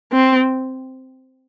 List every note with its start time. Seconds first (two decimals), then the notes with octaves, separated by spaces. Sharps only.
0.13 C4